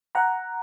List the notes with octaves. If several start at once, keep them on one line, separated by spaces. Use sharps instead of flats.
F#5 A#5